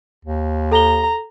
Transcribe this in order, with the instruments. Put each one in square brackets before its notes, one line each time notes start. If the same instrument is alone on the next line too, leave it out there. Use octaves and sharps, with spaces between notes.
[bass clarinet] D#2
[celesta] A4 G7 [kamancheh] A#5